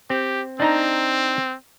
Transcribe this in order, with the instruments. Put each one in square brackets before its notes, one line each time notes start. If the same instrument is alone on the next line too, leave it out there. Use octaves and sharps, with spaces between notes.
[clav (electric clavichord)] C4 [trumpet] G4
[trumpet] C4 [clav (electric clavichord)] D4 D#4 A#5